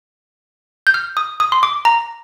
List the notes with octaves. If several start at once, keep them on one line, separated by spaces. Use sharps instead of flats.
G6
F6
D#6
D#6
C6
D6
A#5